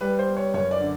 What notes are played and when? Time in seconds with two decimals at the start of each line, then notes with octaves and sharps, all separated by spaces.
0.01 G3 B4
0.19 C5
0.27 B3
0.37 C#5
0.54 F#2 C#5
0.71 D5
0.80 D3